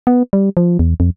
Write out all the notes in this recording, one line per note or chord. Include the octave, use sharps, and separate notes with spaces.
B3
G3
F3
E2
F2